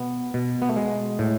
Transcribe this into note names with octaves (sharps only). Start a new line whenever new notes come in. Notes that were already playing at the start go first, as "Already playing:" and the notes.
Already playing: B2 B3
B2
B3
A3
G#3
A2